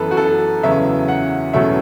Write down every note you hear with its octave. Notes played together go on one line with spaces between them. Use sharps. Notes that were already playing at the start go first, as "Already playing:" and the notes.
Already playing: F#2 E3 B3 A4 B4
F#4
A4
E2 C#3 F#3 B3 E5
F#5
E2 B2 F#3 A3 C#4 E5